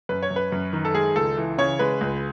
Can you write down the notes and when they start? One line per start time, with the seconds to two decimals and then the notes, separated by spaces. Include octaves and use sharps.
0.09 F#2 B4
0.23 C#5
0.31 F#2
0.36 B4
0.52 F#2
0.73 D#3
0.85 A4
0.95 G#3 G#4
1.16 C#2 A4
1.37 E3
1.58 C#3 C#5
1.79 G#3 B4
2.01 C#2